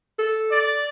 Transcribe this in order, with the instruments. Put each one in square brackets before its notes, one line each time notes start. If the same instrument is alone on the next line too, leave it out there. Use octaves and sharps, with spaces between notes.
[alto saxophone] A4
[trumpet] D5